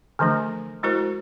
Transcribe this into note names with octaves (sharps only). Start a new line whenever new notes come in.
D3 E3 F3 A3 D4
G#3 E4 F#4 A#4 C5